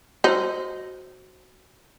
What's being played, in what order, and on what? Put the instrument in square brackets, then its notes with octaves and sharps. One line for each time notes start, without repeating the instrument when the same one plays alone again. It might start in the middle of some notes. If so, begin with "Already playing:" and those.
[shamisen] D#4 [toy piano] F#4 C5 E6